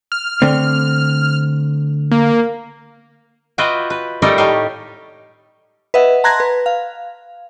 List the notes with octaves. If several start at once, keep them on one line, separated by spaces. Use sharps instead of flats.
F6
D3 A3 C4
A#3
F4 F#4 B4 D#5 E5 G5
B4
G3 A3 D#4 G4 A4 A#4
A2 D#4 G4 C#5 F5
B4 D#5 E5 F#5
A5 A#5 C6 F#6 G#6 A#6
B4
F5